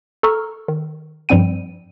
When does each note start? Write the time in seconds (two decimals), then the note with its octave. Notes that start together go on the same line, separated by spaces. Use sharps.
0.23 A4 A#5 C#6 E6 F6
0.68 D#3
1.29 G2 F3 G3 C4 G5 D#7